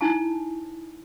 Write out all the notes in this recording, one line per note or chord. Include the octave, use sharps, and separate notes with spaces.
D#4 E4 G#5 A5